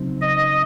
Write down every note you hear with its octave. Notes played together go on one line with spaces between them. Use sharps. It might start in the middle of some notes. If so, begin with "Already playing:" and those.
Already playing: C#3 F#3 C4 D#4
D#5